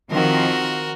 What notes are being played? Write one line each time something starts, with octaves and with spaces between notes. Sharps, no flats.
D#3 F3 C4 F#4 A#4